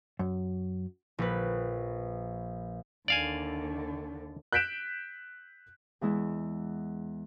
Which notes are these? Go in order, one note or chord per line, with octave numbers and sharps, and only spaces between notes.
F#2
A#1 B4
D#2 D3 D5 F5 G#5
F#6 G6 B6 D7 E7
E2 E3 G#3 E4